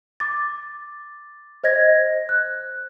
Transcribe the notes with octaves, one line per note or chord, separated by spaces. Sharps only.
D6 A6
C5 D#5 G#6 A#6
F#6